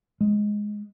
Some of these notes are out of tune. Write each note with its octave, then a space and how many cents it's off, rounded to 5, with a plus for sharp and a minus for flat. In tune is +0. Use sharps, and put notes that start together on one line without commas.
G#3 +5